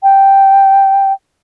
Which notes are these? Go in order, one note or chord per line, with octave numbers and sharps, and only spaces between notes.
G5